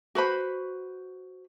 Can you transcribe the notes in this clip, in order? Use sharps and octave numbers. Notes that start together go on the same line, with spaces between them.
F#4 B4 C5 B5